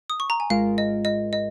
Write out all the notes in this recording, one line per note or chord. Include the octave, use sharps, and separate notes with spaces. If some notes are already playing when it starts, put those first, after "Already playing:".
D#6
C#6
A#5
G#5
G#1 G#2 G#3 F4 A#4 F5
D#5
D#5
D#5